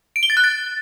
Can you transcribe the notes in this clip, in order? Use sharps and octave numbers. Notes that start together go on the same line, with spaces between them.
D7
G7
A6
F#6
A6